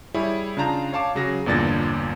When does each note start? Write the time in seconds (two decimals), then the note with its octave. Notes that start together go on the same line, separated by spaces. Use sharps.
0.14 G3 E4 G#4 C#5
0.57 C#3 D4 F4 A5 A#5 G6
0.93 C#5 F5 A5 D6
1.15 C#3 F#3 G#4 A#6
1.46 G1 E2 A#2 D4 A6 A#6